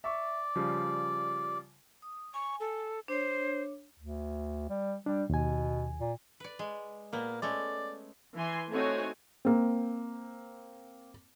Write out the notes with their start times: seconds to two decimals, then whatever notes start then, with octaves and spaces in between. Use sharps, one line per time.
0.04 D5 E5 C#6
0.55 C#3 F3 G3
2.02 D#6
2.34 G#5 C#6
2.60 A4
3.08 D4 C5 C#5
3.99 D2
4.70 G3
5.06 G3 D4
5.30 D#2 B2 G#5
5.99 A#2
6.40 B4 D5
6.59 G#3
7.13 A#2 A#3 B3
7.42 G#3 A3 C#4 D5
8.35 E3 G#5 C6
8.70 A3 C4 D#4 F#4 C#5 G#5
9.45 A#3 C4